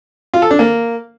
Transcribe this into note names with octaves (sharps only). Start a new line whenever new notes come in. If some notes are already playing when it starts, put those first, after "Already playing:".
F4
A4
D4
A#3